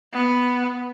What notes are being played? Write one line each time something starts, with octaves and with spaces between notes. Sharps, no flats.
B3